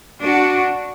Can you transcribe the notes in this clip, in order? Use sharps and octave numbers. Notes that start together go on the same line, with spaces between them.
D4 F#4